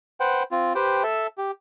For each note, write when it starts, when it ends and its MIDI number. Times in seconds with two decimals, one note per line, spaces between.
0.20 0.43 71
0.20 0.43 72
0.20 0.43 78
0.20 0.43 79
0.51 0.73 60
0.51 0.73 65
0.75 1.03 67
0.75 1.03 71
0.75 1.03 72
0.75 1.03 79
1.03 1.27 69
1.03 1.27 76
1.03 1.27 81
1.38 1.51 67